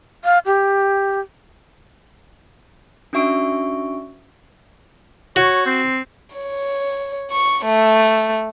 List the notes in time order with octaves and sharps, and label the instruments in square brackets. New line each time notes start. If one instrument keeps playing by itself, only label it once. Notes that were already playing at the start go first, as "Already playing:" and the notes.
[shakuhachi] F5
G4
[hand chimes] C#4 D4 F#4 E5 C#6 D7
[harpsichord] F#4 [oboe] C#5
[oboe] C4
[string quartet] C#5
C#6
A3